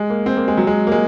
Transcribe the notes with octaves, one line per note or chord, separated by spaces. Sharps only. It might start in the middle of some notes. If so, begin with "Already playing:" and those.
Already playing: G#3
A#3
C4
A#3
G#3
F#3
G#3
A#3
G#3